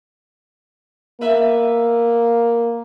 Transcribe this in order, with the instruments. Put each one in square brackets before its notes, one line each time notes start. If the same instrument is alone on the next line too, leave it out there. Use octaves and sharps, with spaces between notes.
[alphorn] A#3 [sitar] B3 B4 E5